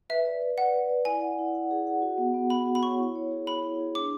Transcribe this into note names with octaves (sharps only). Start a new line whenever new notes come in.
B4 E5
D5
B4
D5 F#5
B4
D5
E4 G#5
F#5
E4
F#5
G#4
F#5
F#4
B3
B3
F#4 B5
F#4
B5
C#5 C#6
E4
C#5
G#4
C#5 B5
E4
G#4
D4 D6